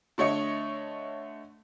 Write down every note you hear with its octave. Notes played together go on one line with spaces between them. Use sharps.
D3 A3 C#5 D#5 C#7